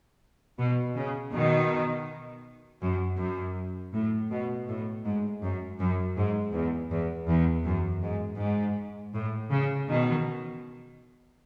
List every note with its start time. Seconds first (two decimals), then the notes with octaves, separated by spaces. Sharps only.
0.58 B2
0.96 C#3
1.33 B2 D#3
2.82 F#2
3.18 F#2
3.93 A2
4.30 B2
4.68 A2
5.05 G#2
5.42 F#2
5.80 F#2
6.17 G#2
6.53 E2
6.91 E2
7.29 E2
7.65 F#2
8.02 G#2
8.40 G#2
9.14 A2
9.52 C#3
9.88 B2 D#3